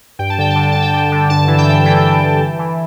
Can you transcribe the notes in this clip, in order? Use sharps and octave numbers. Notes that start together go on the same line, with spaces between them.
G2 G5
A5
D3 G5
A5
D3
G5
D3 A5
G5
D3
D3
G2 A5
E3
G5
G2
E3 G5
G2
E3
E3
E3